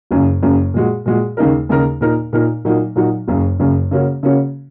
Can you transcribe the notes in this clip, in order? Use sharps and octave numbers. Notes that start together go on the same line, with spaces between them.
F#1 F#2 C#3
F#1 F#2 C#3
A#2 G#3 F#4
A#2 G#3 F#4
D#2 C#3 A#3 D#4 A#4
D#2 C#3 A#3 D#4 A#4
A#2 A#3 D#4 A#4
A#2 A#3 D#4 A#4
A#2 F#3 A#3 D#4 F#4
A#2 F#3 A#3 D#4 F#4
F#1 F#2 C#3
F#1 F#2 C#3
C#3 A#3 C#4 F#4
C#3 A#3 C#4 F#4